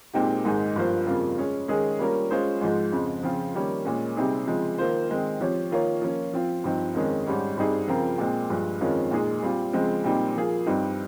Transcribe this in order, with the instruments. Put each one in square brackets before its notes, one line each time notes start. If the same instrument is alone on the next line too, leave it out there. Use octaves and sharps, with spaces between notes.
[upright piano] A#2 G#3 C4 D#4 G4
G#2 D#3 G#3 D#4 G#4
G2 F3 A#3 F4 C5
F2 C#3 G3 A#3 F4
G#3 C#4 G#4
D#3 G#3 C#4 G#4
G3 A#3 C#4 F4 A#4
G#3 C#4 F4 G#4 C5
G#2 F3 G#3
F2 C#3 G#3
C#3 F3 C4 F4
D#3 G3 A#3 C#4
A#2 G#3 C#4
C3 G3 C4 D#4 G#4
C#3 F3 G#3 C4
D#3 A#3 F4 C5
D#3 G#3 C4
F3 C4 G4 C#5
D#3 A#3 F4 A#4 C#5
F3 A#3 C#4 F4
F3 C4 F4
G2 F3 C4 D#4
F2 D#3 G#3 C#4 G#4
G#2 G3 C#4
G2 G3 C4 D#4 G#4
C#3 F3 C4 F4 A#4
A#2 G#3 C4
G2 F3 G#3
F2 D#3 G#3 C#4 F4
A#2 G#3 D#4 G#4
G3 C4 F4
C#3 F3 G#3 C4
A#2 G3 C4 D#4
F3 A#3 F4 G#4
G2 G3 C4 D#4